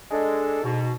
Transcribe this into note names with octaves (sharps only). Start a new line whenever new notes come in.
G#3 D4 A4
G#2 B2